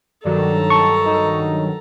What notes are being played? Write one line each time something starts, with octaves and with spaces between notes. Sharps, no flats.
G2 D#3 F#3 A4 D5 A#5
A5 C#6
D#4